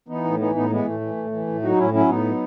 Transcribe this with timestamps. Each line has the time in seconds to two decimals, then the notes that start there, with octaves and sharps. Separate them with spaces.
0.08 E3 B3 D#4
0.24 A2
0.39 E3 B3 D#4
0.55 A2 B3 D#4
0.70 E3 G#3 B3
0.85 A2 A3
1.01 E3
1.17 A2
1.32 E3
1.47 A2
1.63 F#3 D#4 F#4
1.78 A2 C#4 E4
1.94 F#3 C#4 E4
2.09 A2 B3 D#4
2.24 F#3